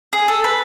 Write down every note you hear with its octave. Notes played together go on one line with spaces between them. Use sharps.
G#4
A4
B4